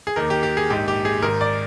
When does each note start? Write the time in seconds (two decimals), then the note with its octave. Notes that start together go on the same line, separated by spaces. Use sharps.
0.07 G#4
0.16 D#2 D#3 A#4
0.30 G4
0.43 G4
0.57 G#4
0.70 A#1 G#2 D#3 G4
0.88 G4
1.05 G#4
1.22 G#1 G#2 D#3 A#4
1.41 D5